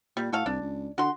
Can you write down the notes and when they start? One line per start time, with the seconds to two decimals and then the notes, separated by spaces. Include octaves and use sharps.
0.17 A#2 G3
0.33 A2 F#4 A4 F5
0.46 C2 D4
0.62 C#2
0.98 D3 F#4 C6